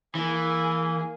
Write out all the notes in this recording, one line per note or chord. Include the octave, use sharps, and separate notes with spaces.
E3 A#3 G#4